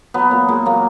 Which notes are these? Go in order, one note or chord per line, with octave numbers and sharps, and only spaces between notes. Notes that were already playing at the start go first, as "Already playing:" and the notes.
F#3 B3
A#2
A#2 G#3
F#3 A#3